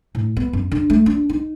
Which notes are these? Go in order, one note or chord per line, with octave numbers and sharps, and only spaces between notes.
A2
B3
F#2
D3
A3
D4
D#4